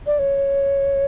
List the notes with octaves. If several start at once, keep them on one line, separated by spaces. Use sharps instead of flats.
D5
C#5